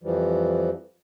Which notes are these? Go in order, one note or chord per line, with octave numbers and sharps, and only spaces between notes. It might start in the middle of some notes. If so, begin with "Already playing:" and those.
F2 E3 F3 G3